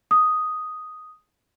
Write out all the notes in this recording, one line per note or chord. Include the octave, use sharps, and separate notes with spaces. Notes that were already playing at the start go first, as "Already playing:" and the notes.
D#6